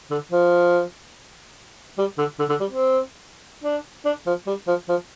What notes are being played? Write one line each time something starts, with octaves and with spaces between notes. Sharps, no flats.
D3
F3
G3
D3
D3
D3
G3
C4
D4
D4
F3
G3
F3
F3